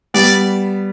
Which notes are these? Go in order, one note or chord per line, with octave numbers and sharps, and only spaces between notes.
G3 B3 D5